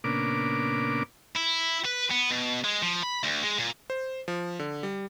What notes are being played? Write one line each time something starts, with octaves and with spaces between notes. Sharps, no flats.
A#2 C#3 A#3 B3 D4 D6
E4
B4
B3
B2
G#3
F3
B5
D2
G#3
A#2
C5
F3
D3
G3